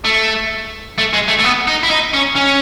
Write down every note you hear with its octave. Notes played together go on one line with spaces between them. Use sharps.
A3
A3
G#3
A3
A3
B3
D#4
E4
D#4
C#4
C#4